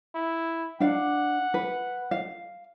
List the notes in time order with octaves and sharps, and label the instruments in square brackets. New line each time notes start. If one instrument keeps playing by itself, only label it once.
[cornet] E4
[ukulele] D4 F5 [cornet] F#5
[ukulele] B4
F5